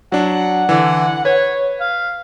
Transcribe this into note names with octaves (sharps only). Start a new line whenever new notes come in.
F#3 D4 F#5
D3 E3
B4 C#5
F5